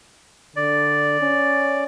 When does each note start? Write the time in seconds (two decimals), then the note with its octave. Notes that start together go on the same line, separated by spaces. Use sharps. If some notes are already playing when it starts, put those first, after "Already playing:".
0.56 D3 D5
1.21 C#4